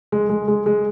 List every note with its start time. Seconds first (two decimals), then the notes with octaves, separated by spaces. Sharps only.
0.12 G#3
0.29 G#3
0.48 G#3
0.66 G#3